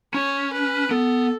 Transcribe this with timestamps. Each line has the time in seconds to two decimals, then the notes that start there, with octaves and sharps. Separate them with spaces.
0.14 C#4 C#5
0.53 B4
0.91 B3 A4